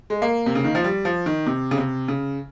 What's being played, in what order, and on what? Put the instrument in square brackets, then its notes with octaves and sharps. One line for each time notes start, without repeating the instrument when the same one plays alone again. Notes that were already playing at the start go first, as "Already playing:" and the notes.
[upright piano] G#3
A#3
C3
C#3
D#3
F3
G3
F3
D#3
C3
C#3
C3
C#3